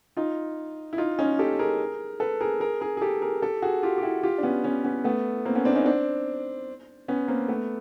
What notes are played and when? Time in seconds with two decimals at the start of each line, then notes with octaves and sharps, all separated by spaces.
0.17 D#4 F4
0.93 E4
0.98 D#4 F4
1.19 C#4 D#4
1.39 G4 A4
1.59 G#4 A#4
2.20 A4 B4
2.41 G#4 A#4
2.60 G#4 A#4
2.81 G#4 A#4
2.97 G#4
3.01 G4 A4
3.22 G#4 A#4
3.42 G4 A4
3.62 F#4 G#4
3.83 F4 G4
3.98 G4
4.03 E4 F#4
4.23 F4 G4
4.38 D4
4.43 B3 C#4
4.64 B3 C#4
4.84 B3 C#4
5.04 A3 B3
5.46 A#3 C4
5.55 B3 C#4
5.65 C4 D4
5.75 C#4 D#4
5.86 C4 D4
7.08 B3 C#4
7.28 A#3 C4
7.48 A3 B3